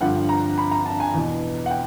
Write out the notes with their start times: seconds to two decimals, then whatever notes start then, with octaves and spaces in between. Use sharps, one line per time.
0.01 G2 D3 F3 F#5
0.29 A#5
0.58 B5
0.71 A#5
0.86 A5
1.00 G#5
1.14 E2 B2
1.66 F#5
1.71 G5